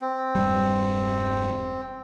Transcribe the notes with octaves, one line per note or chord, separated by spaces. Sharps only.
C4
E1 G2 G3